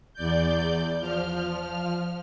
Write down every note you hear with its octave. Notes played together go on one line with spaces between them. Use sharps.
E2 D5 G6
F3 F6